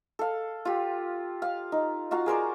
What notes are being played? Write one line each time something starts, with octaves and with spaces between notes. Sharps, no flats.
A4 F5
F4 G4
F5
D#4
F4 F#4 F5 A#5
G#4 A#4 C5 D5